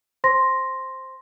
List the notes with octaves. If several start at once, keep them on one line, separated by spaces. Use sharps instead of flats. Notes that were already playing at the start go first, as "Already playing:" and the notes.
C5 C6 A#6